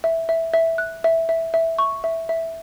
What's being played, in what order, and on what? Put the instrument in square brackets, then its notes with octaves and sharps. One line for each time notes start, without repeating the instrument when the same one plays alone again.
[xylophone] E5
E5
E5
F#6
E5
E5
E5
C#6
E5
E5